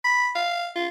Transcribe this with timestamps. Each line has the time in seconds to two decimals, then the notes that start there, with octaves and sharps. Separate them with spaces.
0.04 B5
0.35 F5
0.76 F4